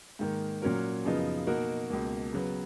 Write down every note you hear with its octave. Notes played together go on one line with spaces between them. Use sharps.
G#2 D#3 A#3
A#2 F#3 C#4 F#4 A#4
F#2 C#3 F3 B3 D#4
B2 A#3 D#4 F#4 A#4
C#2 B2 A#3
C#3 F#3 B3